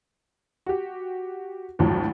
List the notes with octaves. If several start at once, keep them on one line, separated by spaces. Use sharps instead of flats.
F#4 G4
G#1 D2 A2 F3 F#3